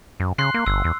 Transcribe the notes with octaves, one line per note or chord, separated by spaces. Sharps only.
F#2
C#3 C6 F#6 C7
A#3
G1 E6
E2